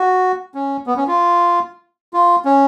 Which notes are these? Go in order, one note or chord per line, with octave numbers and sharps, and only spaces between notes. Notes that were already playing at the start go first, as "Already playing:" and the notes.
Already playing: F#4
C#4
B3
C#4
F4
F4
C#4